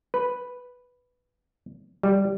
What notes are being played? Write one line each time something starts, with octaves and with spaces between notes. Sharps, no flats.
B4
G3